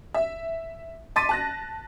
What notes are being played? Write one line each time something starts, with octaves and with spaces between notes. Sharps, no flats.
E5
A5 C6 D6 A6 B6 D#7
A5 F#6 A#6